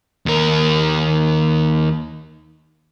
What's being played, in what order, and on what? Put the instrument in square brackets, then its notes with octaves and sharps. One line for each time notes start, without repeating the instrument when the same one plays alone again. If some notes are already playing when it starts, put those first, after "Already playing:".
[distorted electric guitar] D#2 A#4